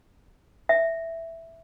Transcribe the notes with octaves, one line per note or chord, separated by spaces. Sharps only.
E5